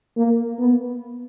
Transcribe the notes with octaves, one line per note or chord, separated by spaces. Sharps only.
A#3
B3